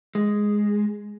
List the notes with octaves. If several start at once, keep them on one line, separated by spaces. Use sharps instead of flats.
G#3